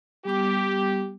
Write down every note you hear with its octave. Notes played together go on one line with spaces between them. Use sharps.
G3 B3 G4 D6